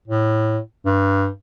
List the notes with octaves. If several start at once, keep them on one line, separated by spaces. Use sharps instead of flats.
A2
G2